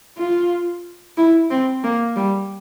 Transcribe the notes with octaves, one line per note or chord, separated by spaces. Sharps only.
F4
E4
C4
A#3
G3